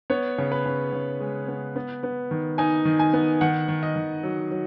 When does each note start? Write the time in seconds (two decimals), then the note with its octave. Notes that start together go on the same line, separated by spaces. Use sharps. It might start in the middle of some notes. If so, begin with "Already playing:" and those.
0.10 B3 C#5
0.38 C#3
0.52 B4
0.66 C#3
0.93 C#3
1.20 G#3
1.48 B3
1.76 B3
2.03 B3
2.31 D#3
2.58 D#4 G#5
2.85 D#3
2.99 G#5
3.13 B3
3.41 D#3 F#5
3.68 D#3
3.83 D#5
3.96 D#3
4.23 F#3
4.51 F#3